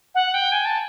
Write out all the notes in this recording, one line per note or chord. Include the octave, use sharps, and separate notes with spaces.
F#5
G5
G#5
A5